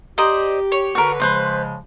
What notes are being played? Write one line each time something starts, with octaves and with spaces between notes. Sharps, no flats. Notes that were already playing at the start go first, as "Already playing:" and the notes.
G4 C5 D5 D#5 A#5
C#5
D3 F#4 A#4 B4
C#3 F3 G#3 B4 C5 C6